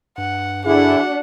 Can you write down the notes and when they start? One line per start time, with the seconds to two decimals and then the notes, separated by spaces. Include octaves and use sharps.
0.18 G2 F#5
0.65 D3 D4 E4 F#4 G#4 F#5